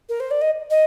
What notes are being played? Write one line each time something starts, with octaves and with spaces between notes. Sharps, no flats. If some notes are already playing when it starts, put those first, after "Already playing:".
A#4
C5
D5
D#5
D#5